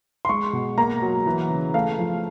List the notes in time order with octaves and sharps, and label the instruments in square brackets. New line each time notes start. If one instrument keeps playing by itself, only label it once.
[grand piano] C6
G#3 C#6
B2
A#3 A#5
F#3
E3
C#3
A3 F5
F3